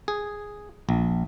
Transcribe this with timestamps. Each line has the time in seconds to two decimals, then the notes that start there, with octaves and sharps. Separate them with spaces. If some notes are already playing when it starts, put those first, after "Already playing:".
0.08 G#4
0.89 A#1